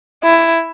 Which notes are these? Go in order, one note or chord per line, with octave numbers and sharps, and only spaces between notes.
E4